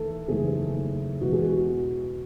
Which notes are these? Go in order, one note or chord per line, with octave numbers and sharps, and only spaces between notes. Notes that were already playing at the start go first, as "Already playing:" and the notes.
Already playing: E2 D#3 A3 A4
F#1 E2 D#3 A3 G#4
E2 B2 G#3 B3 F#4
G#4
F#4